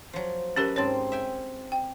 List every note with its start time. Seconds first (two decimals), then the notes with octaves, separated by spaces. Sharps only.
0.13 F3 F#3
0.56 F#3 C#4 G4 A#4 B4 D#5
0.76 G#2 C4 C#4 C#5
1.12 E5 G5 G#5
1.72 G5